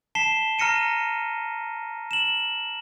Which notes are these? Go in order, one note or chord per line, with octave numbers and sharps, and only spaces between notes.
A5 B6 C7 E7 G7
A#5 F6 A#6 C#7 D#7
E7 F#7